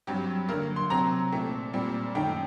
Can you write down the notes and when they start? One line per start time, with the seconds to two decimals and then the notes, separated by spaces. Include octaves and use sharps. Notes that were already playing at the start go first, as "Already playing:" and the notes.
0.07 G2 F#3 C4 G4
0.49 D3 F#3 A#3 A#4
0.76 C6
0.90 C3 F#3 C4 A#5
1.32 A#2 A3 C4
1.73 A#2 G3 C4
2.15 F#2 D#3 A3 G5